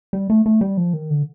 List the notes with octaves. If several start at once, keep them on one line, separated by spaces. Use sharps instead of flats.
G3
A3
A3
G3
F3
D#3
D3